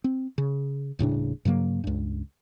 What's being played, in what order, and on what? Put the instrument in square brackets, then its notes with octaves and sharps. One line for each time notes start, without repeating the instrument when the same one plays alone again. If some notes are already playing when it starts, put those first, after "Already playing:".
[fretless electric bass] C4
C#3
D#1 A2 C#3 D4
G2 C#3 F#3 A#3
C#2 G2